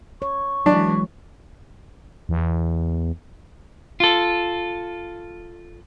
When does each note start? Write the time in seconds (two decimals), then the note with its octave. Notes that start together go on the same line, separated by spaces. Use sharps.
0.22 C#5 C#6
0.66 E3 F#3 G#3 D4
2.29 E2
4.00 F4 A4